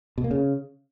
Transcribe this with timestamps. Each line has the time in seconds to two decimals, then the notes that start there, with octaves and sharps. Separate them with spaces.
0.18 B2
0.24 A#3
0.31 C#3